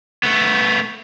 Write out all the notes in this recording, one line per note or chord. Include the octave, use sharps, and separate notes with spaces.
A3 B3